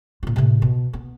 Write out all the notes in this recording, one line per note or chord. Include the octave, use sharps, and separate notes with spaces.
A#2 F4
A2 C3
B2
B3